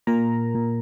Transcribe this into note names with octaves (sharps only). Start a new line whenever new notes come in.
A#2 A#4 A#5
A#2